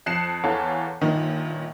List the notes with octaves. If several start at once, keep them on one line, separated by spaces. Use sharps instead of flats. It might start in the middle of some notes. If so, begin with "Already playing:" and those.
F2 F#6 C7 C#7 E7
E2 E3 A4 C#5 F5 A5
G1 A#2 D#3